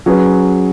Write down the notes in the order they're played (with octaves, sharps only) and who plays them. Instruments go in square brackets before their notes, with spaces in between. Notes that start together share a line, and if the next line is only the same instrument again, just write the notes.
[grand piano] F#3 C#4 G#4 B4